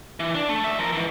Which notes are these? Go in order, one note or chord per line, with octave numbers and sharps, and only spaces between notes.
E3
D4
A3
D2 E5
F3 A#4
G#2 E3